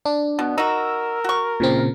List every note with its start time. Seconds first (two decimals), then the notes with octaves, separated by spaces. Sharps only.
0.05 D4
0.39 B2 B3
0.58 D#4 F#4 A#4 E6
1.24 F#4 C#6
1.60 A#2 C#3 C4